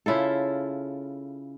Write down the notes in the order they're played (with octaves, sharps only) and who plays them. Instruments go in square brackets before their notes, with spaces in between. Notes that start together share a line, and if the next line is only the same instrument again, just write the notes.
[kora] C#3 E4 F4 A4